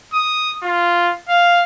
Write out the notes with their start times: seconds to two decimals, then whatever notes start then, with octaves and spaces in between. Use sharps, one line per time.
0.14 D#6
0.63 F4
1.29 F5